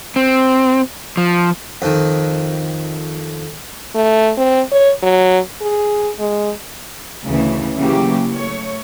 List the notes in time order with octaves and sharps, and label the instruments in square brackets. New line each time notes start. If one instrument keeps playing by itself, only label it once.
[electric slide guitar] C4
F3
[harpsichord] F2 D#3
[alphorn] A3
C4
C#5
F#3
G#4
G#3
[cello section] D2 C#3 E3
C#3 E3 F#3 A#3 G4
A3 C#5